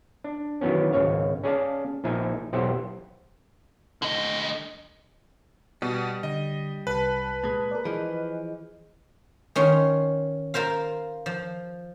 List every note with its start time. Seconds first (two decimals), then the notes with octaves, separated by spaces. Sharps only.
0.24 D4
0.61 D#3 E3 F#3 B3 C#4
0.93 G#1 C#2 C#5 F5
1.44 C#4 G#4 D5 F5 A5
2.04 A#1 F3 D#4 E5 G#5
2.53 B1 E2 G4 C5 E5 F#5
4.02 D3 D#5
5.82 B2 G3
6.23 D3 D#5
6.87 C2 B4 A5
7.44 A#2 G#3
7.71 A#4 D5
7.85 E3 F3 G#4 D#5
9.55 D#3 C#4 C6
10.54 F4 A#4 C5 F5
11.26 F3